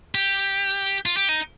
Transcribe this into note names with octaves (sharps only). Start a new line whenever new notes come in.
G4
F4
G4
D#4